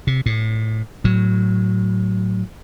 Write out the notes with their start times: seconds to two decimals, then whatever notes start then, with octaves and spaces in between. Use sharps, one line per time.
0.07 C3
0.26 A2
1.04 A2 F#3